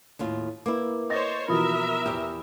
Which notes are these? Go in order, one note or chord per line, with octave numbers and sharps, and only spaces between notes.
D#2 A2 F4
A#3 E4 A#4 B4 D6
C5 C#5 D#5 A6 A#6
B2 E3 F3 A#4 E5 B5 D#6
E2 G4